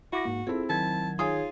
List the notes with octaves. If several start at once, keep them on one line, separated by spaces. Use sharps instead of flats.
E4 F#4 D6 A#6
G#2 A#3
C4 E4 F4 G#4 A4
D#3 F#3 A5 G#6
D#4 F4 G#4 C#5 G#5 D#6